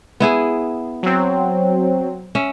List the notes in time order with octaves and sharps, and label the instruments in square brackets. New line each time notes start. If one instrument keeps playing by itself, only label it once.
[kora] B3 E4 G#4
[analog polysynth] F#3 C4
[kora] C#4 E5